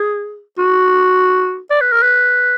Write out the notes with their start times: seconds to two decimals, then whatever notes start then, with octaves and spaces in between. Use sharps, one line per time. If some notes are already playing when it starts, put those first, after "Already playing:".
Already playing: G#4
0.58 F#4
1.70 D5
1.81 B4
1.92 A#4
2.03 B4